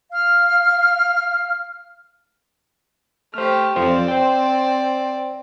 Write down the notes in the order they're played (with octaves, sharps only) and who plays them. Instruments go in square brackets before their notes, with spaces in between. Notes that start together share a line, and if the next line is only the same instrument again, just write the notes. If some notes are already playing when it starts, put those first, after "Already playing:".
[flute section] F5 F6
[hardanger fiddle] A3 G4 [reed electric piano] C5 F6
[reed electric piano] F2 F4 C5 [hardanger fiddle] C4 D5
[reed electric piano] C5 G5